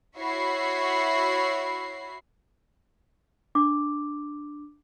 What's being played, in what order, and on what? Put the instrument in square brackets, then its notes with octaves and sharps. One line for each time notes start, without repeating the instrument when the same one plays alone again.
[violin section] E4 F#4 C#5 E5 B5 C7
[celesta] D4 D6